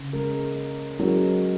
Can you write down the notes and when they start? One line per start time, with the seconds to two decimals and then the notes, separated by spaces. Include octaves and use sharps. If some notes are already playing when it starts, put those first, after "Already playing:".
Already playing: C#3
0.13 G#3 C#4 A#4
1.00 F#3 G#3 C#4 A#4